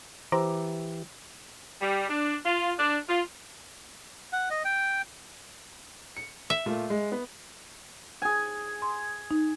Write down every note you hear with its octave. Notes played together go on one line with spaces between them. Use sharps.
E3 G4 C5 E5 A#5 D6
G3
D4
F4
D4
F4
F#5
D#5
G5
C#7
E5
A#2 A3 F4
G#3
B3
G#4 G#5
C6
D#4